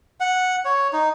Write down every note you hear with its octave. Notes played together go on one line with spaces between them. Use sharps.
F#5
C#5
D#4